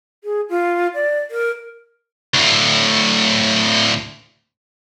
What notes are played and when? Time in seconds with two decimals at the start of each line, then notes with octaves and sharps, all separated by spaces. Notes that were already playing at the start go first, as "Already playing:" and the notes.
0.24 G#4
0.49 F4
0.94 D5
1.31 A#4
2.34 D2 A2